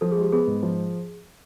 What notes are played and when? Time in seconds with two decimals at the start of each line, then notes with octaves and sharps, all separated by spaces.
0.01 F3 A4
0.12 G#4
0.16 G#3
0.22 G4
0.32 B3 G#4
0.47 G#2
0.63 F3